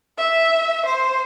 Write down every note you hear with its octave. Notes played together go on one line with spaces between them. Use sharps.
E5
C5